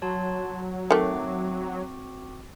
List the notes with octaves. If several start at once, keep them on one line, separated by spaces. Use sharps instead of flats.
F#3 C#5 A5 C6
D#3 A3 C4 F#4 D6